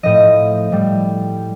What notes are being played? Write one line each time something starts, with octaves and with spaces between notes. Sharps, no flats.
A2 F3 D#5
A2 G3